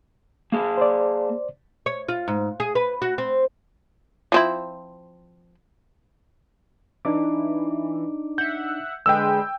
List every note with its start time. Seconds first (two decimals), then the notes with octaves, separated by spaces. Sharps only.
0.52 A#3 G#4
0.78 C5 D5
1.86 C#5
2.08 F4
2.28 G#2
2.60 G#4
2.75 B4
3.02 F#4
3.18 C4
4.32 F3 C4 E4
7.05 E3 D4 D#4 D6
8.38 E5 F#5 G6
9.06 D3 G#3 B4 G5 E6